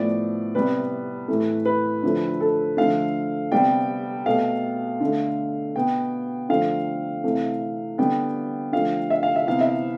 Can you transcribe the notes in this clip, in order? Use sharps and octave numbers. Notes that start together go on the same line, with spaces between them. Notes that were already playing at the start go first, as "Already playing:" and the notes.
Already playing: A2 F3 B3 D5
C3 G3 B3 B4
A2 E3 A3
B4
D3 F3 A3
A4
D3 F3 A3 F5
C3 G3 B3 G5
B2 A3 F5
D3 A3
B2 B3 G5
D3 F3 A3 F5
C3 E3 A3
D3 G3 B3 G5
D3 F3 A3 F5
E5
F5
E5
C3 E3 B3 F5
E5